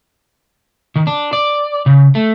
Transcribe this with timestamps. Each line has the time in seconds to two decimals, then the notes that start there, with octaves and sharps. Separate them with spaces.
0.96 D#3
1.07 D4
1.33 D5
1.86 C#3
2.15 A3